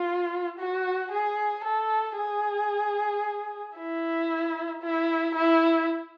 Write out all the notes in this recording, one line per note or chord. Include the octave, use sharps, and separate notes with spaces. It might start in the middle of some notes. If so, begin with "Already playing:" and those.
Already playing: F4
F#4
G#4
A4
G#4
E4
E4
E4